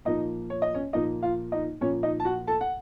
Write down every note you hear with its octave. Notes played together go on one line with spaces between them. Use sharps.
A#2 F3 A#3 D#4 D#5
C#5
D#5
C#4 C#5
A#2 F3 A#3 D#4 D#5
F4 F5
D#4 D#5
A#2 F3 A#3 C#4 C#5
D#4 D#5
A5
F#4 F#5
A4 A5
F#5